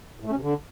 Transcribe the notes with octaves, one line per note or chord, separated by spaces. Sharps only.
A2
A3
C#4
C3
D3